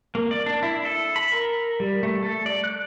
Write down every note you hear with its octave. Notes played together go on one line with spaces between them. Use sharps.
A#3
D5
D4
E4
A4
B5
A#4
G3
A3
A4
D5
F#6